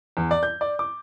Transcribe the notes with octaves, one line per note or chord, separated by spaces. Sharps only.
E2
D5
G6
D5
D6